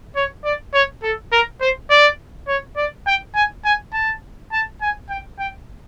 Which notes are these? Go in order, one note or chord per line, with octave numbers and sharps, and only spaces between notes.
C#5
D5
C#5
A4
A#4
C5
D5
C#5
D5
G5
G#5
G#5
A5
A5
G#5
G5
G5